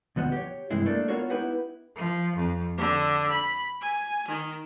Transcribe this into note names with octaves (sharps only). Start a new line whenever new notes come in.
D2 F3 B3 D#5 F#5
G4 C#5
G2 C3 E3 G#3 E4
A3 A#3 D4
B3 F4 F#4 A#4 C#5
B3 D#4 E4 G4 B4 F#5
F3
F2
D3
B5
G#5
D#3